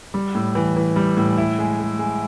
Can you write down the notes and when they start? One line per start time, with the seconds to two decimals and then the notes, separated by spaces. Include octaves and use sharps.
0.14 G3
0.35 A2
0.55 E3
0.76 E3
0.96 G3
1.17 A2
1.38 E4
1.59 G#3
1.79 G#3
1.99 G#3